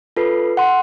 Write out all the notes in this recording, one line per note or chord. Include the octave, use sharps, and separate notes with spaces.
F4 A4 B4 C7
F#5 C6